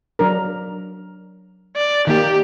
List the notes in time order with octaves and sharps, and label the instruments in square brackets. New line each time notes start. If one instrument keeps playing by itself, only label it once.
[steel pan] F#3 D4 A#4
[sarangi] D5
[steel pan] D#3 A#3 [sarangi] G4